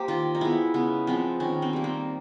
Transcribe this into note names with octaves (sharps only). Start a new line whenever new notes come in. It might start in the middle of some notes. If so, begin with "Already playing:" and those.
Already playing: A#3 G4 C5
D#3 F4
D#4
G#3 B3 E4
C#3 B3
F3 G#3 B3 C4
D#3 C#4
C4
G3 A#3
C4